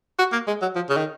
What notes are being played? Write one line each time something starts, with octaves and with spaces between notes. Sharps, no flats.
F#4
A#3
G#3
F#3
F3
C#3
D#3